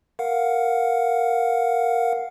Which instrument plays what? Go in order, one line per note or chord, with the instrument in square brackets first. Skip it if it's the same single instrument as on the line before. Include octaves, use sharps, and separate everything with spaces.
[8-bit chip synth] A#4 F5 F#5